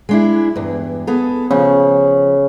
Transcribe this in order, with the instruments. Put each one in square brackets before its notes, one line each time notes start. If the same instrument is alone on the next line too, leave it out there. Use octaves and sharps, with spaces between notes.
[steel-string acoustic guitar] G#3 D4 E4
E2 G2
B3 G#4 A4
[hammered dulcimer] C#3 [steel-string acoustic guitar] F3